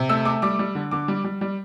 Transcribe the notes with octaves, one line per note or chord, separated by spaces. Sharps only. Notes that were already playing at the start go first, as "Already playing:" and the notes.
Already playing: C3
A3 E6
A3 D6
G3 D6
G3
D3
D3 D6
G3
G3
G3